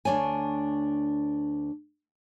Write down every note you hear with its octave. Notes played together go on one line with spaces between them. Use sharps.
D2 E3 D4 C#5 G#5